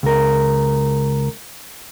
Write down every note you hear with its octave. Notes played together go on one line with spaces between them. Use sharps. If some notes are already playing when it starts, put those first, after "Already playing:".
C#2 A#4